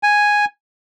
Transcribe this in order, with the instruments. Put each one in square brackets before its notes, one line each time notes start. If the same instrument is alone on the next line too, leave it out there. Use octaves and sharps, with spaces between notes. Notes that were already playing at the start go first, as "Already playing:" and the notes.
[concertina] G#5